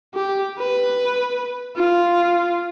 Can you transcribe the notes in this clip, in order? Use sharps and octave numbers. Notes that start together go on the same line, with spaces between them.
G4
B4
F4